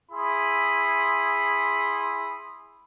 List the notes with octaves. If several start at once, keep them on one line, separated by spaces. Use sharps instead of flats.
E4 G#4 B5 C6 D#6